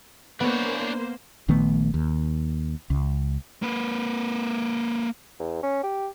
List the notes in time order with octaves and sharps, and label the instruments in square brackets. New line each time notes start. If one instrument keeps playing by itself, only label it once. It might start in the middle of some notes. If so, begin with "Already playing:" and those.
[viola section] A#3 C5 [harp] B3 [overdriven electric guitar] D4 C#5
[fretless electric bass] A#1 D#3 A3 B3
D#2
C#2
[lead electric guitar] A#3 B4
[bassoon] E2
C#4
G4